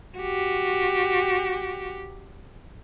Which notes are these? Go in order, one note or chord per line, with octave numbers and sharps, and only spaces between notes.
F#4 G4